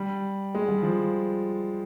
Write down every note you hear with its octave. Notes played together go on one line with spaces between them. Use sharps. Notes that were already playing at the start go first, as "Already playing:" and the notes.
Already playing: G3
G#3
G3
F3